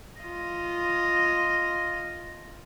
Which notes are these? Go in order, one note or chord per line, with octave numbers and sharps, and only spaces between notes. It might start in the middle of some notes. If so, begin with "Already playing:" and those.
F4 D#5